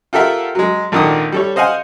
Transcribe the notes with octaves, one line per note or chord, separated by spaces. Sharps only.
F4 G4 A4 A#4 E5 F#5
F#3 G#3
G#1 A#2 D3 D#3 D#6
G3 A4 C#5
C5 D#5 F5 F#5 G#5